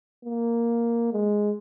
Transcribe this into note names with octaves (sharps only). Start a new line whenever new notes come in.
A#3
G#3